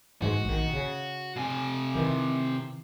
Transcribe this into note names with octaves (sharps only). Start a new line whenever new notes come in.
G#2 E3 G#3 F#4
A#1 D#3
C#3
C3 G#5
D#3 E3